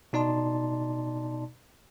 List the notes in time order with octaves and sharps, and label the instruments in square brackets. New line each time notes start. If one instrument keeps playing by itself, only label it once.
[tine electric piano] B2 D#4 D5 A5 C6